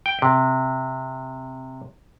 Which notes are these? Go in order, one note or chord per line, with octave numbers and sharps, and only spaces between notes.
G5
C3